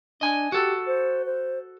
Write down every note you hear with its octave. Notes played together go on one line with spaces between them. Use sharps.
D4 D#5 G#5
F#4 G4 A4
C5
C5